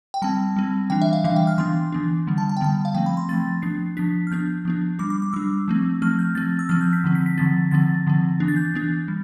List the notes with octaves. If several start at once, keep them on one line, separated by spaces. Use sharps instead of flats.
G5
G3 C4 A5
G3 C4
E3 G3 D4 G5
E5
F5
E3 G3 D4 F5
G5
F6
E3 B3 D4 C6
E3 B3 D4
D3 G3 B3
A5
A5
G5
D3 G3 B3 A5
F5
F3 A3 C4 G5
B5
C6
F3 A3 C4 A6
F3 B3 D4 C7
F3 B3 D4 B6
F6
F3 B3 D4 G6
F3 B3 D4
G3 D4 D6
D6
D6
G3 D4 E6
F3 A3 C4
F3 A3 C4 F6
G6
F3 C4 A6
E6
F3 C4 F6
G6
B6
D3 F3 C4
B6
B6
D3 F3 C4 A6
D3 F3 C4 A6
D3 F3 C4
E3 B3 D4
A6
G6
E3 B3 D4
G3